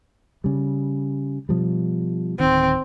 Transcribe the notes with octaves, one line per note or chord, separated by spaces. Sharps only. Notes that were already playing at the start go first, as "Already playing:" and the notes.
C#3 G3
B2 F3 G3
D1 D#3 C4